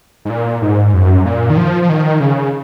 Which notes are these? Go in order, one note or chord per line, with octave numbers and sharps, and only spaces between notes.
G#2
A#2
G#2
F#2
A#2
D#3
F3
F3
D#3
C#3